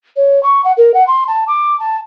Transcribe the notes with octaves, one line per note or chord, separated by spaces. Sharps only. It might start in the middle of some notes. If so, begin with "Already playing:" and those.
C#5
C#6
F#5
A#4
F#5
C6
A5
D6
A5